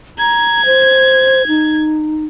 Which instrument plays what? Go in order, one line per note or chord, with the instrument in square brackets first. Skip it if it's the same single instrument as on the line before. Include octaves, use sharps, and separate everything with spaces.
[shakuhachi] A#5 [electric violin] G#6
[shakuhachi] C5
D#4